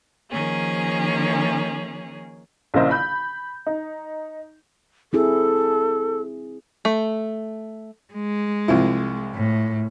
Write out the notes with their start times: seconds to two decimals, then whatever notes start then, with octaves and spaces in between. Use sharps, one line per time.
0.30 D#3 F3 A#3 C#4 G#4
2.74 A#1 C#3 A#3 E4 C5 D#5
2.91 B5 G6
3.67 D#4
5.13 C4 E4 G#4 A4
6.85 A3
8.14 G#3
8.68 C2 F3 E4
9.35 A2